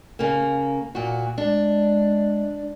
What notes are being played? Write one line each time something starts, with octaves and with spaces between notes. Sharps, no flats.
C#3 A#3
A#2 F#4
G#3 D4